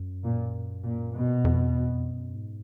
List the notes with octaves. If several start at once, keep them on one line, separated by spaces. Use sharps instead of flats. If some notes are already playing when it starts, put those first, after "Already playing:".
Already playing: F#2
A#2
A#2
B2
F2
E2
F2
F#2
G#2